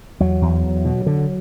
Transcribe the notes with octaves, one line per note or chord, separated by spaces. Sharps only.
E2 F#3
E2
E2
B2
D3